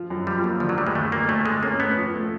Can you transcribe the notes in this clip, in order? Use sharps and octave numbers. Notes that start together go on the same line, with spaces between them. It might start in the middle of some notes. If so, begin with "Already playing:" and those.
Already playing: F3
F#2
F3 G3
F#3 A#3
D3 F3
F#3
D2 G3
G#3
D2 A3
D2 A#3
A2 A3
G#3 A3
A#3 C#4
A2 B3
F3
A3